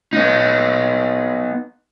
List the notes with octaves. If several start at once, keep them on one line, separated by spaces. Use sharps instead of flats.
B3 D#4